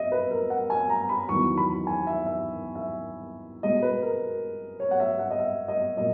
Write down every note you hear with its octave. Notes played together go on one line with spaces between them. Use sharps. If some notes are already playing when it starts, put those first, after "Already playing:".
Already playing: D#5 E5
B4
A#4
F#5
G#5
A#5
B5
E2 D#3 F#3 C#6
B5
G#5
E5
E5
E5
B2 G#3 D#5
B4
A#4
C#5
F#5
E5
F#5
D#5
E5
D#5
A#2 F#3 D#5